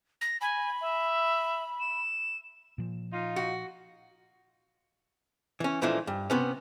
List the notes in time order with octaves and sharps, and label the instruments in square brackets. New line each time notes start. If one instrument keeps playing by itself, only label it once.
[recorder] A#6
[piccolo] G#5 [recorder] B5
[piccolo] E5
E7
[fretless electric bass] A#2 F3
[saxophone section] D#4 F4
[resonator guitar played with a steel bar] F#4
[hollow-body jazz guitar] E3 C#4
A#2 E3 F3 G#3 A3 D4
G2
C3 B3 C#4